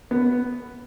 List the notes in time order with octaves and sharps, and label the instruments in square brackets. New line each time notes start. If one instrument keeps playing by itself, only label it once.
[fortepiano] B3